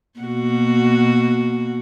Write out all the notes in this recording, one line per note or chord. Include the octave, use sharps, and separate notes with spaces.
B2 A#3 F#4